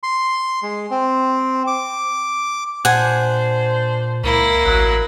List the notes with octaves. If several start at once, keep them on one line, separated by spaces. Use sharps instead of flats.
C6
G#3
C4
D6
A#2 D4 C5 F#5 G#5
C#2 A#3 E4
A1 F#3